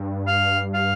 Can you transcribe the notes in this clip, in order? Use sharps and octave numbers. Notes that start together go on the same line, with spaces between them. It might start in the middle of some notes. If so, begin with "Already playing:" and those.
Already playing: G2
F5
F5